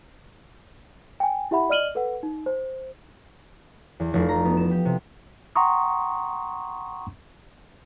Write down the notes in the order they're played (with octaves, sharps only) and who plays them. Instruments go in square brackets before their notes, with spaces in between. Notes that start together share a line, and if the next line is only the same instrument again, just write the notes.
[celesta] G5 G#5
E4 G4 E5 F#5 B5
D5 D#5 F6 D#7 F#7 G7
A4 B4 F#5
D#4
C5
[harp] E2
F1
A#5
B3
E7
G4
C3
[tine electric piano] F#5 G5 A#5 C6 C#6 D#6